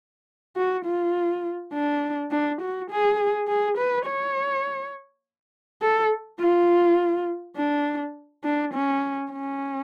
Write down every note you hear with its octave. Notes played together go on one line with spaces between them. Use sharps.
F#4
F4
D4
D4
F#4
G#4
G#4
B4
C#5
A4
F4
D4
D4
C#4
C#4